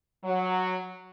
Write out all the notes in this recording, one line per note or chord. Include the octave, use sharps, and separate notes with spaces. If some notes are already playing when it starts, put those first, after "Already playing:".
F#3